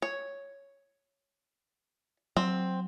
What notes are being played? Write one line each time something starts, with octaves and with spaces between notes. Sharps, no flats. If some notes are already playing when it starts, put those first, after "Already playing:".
C#5
F#3 C4